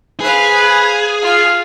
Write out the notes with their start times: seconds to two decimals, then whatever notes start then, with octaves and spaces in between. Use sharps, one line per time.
0.20 G#4 B4 C5 F5
1.22 F4 F5